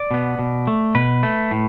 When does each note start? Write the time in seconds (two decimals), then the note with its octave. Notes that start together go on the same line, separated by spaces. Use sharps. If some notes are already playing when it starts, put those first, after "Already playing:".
Already playing: D5
0.11 B2 B3
0.39 B2
0.67 A3
0.95 B2 B4
1.23 A3
1.51 A2